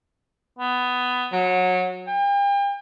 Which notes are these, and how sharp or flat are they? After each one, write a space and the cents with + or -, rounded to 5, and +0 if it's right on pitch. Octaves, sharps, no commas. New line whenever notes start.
B3 +15
F#3 -20
G5 +40